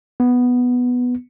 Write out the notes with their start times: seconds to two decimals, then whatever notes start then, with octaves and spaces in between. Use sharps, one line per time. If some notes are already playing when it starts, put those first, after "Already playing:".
0.20 B3